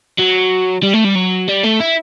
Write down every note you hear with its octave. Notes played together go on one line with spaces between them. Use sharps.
F#3
G3
A3
G3
F#3
G3
A3
E4